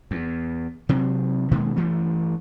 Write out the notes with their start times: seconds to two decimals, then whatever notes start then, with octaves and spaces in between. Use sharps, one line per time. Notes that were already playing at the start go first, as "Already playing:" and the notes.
0.11 E2
0.89 C3 F#3 C4
1.51 B2 D#3 G#3 A#3
1.76 G2 E3 A3